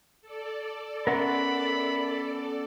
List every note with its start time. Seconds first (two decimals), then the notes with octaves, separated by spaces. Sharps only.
0.22 A4 D5
1.07 B3 C#4 A#4 E5 F#5 B5 C6